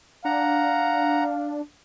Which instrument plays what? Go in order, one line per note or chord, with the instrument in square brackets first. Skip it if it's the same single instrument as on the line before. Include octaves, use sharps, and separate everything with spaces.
[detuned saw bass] D4 [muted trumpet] F5 [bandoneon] F#5 A#5